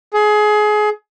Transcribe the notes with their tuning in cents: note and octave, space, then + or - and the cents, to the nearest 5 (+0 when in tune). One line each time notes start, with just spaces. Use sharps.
G#4 +25